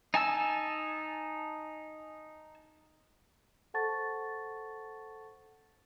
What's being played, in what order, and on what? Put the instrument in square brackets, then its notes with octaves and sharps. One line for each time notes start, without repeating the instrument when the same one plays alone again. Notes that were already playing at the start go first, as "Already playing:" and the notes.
[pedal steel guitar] D#4 G#5 A5 E6
[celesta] A4 C5 F#5 A5 C#6 A6